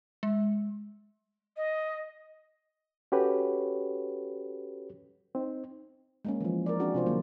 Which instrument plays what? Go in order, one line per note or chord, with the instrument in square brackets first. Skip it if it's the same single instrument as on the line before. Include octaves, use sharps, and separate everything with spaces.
[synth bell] G#3
[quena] D#5
[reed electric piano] C#4 F#4 G4 A4 B4 C#5
C4 D#4
[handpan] G#3 A#3 C#4
E3 F3
A#4 D5
C4 D4 F#4 G#4
C3 F4 C5
D#3 F#3 A#3